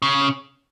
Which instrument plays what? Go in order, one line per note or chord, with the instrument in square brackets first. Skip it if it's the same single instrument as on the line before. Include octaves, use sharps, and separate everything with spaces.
[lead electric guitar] C#3